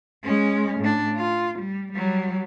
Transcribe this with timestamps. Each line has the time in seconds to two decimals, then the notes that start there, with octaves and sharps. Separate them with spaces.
0.24 G#3 C#4
0.81 A2 D4
1.17 F4
1.59 G3
1.92 F#3 G3